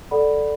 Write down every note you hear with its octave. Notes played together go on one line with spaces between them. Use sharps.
A4 D5 F#5 B5